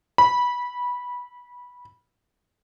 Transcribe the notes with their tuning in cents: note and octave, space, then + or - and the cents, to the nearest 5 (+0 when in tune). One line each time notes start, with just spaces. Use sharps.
B5 -15